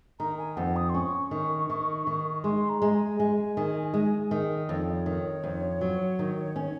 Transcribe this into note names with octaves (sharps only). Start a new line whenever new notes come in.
D#3 A#5
G#5
F2 F#5
D#6
C6
C#4 C#6
D#3
D#3
D#3
G#3 C6
A#5
G#3
G#5
G#3
D#3
G#3 G#5
D#3
F2 C#5
D#5
C#5
D#3
F2
F#3
D#3
C#4